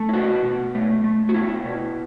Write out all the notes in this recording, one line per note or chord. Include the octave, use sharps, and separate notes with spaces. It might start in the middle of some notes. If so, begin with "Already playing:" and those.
Already playing: A3
E4
B2 F#4
B2
A3
A3
F#4
B2 E4
B2